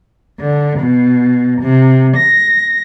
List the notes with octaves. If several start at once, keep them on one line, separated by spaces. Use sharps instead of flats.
D3
B2
C3
A#6